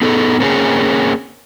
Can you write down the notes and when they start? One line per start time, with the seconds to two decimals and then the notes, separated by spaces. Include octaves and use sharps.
0.02 B3 D#4 G#4 A4
0.40 A#3 C4 C#4 F4 G#4